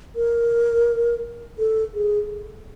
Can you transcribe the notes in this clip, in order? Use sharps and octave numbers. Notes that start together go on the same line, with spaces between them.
A#4
A4
G#4